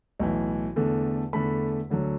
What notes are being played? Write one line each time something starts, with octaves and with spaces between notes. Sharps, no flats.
B1 A2 E3
E2 D3 A3
E2 D3 A3 B5
D2 D3 F#3